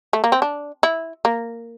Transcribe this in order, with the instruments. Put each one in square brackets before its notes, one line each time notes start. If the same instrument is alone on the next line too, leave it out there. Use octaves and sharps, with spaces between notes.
[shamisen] A3
A#3
C4
D4
E4
A#3